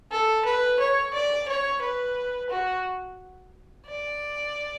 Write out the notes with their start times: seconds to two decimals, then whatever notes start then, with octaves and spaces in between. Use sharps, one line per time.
0.12 A4
0.46 B4
0.80 C#5
1.14 D5
1.48 C#5
1.82 B4
2.50 F#4
3.87 D5